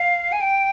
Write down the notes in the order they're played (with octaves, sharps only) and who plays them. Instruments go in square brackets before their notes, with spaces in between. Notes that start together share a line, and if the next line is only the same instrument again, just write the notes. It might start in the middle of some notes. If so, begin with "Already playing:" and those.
Already playing: [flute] F5
G#5
G5